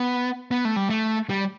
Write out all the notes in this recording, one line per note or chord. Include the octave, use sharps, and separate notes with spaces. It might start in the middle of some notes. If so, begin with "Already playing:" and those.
Already playing: B3
B3
A3
G3
A3
G3